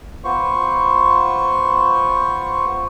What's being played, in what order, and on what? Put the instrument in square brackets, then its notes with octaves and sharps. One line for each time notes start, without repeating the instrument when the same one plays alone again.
[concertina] B3 F4 C5 C#6